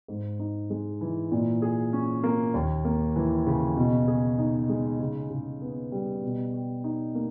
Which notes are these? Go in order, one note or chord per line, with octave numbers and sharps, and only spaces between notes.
G#2
D#4
G#3
E3
A#2
G#4
C#4
A#3
D#2
A#3
E3
C#3
B2
G#4
D#4
G#3
C#3
C#3
B3
G3
B2
G4
D#4
A#3